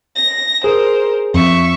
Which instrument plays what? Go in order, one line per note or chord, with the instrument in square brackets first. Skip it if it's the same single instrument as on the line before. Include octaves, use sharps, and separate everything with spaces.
[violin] A#6
[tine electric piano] G#4 [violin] A#4 C5
[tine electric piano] F2 [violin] E5 C#6